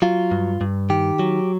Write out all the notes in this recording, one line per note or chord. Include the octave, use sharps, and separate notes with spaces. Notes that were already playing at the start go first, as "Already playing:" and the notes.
F#3 F4
G2
G2
D#3 G4
F#3